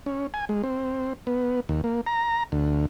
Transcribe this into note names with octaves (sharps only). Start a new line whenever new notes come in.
C#4
G#5
G#3
C4
B3
D#2
A#3
A#5
D2